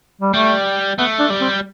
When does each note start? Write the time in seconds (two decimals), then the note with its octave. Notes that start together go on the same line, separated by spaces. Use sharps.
0.21 G3
0.34 G3 A3
0.98 A3 B3
1.19 D4
1.30 G3
1.41 C4